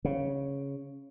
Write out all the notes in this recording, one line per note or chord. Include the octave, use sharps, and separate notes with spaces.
C#3